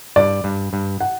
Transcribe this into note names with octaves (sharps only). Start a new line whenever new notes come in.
G2 D5
G2
G2
F#5